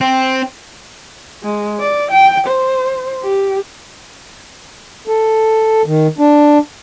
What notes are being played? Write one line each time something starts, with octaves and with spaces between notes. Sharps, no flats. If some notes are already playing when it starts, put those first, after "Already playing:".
C4
G#3
D5
G5
C5
G4
A4
D#3
D4